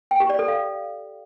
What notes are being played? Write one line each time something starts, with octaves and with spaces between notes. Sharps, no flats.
G5
G4
D5
A4
F5